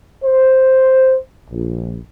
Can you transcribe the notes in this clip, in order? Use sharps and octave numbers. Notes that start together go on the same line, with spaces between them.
C5
A#1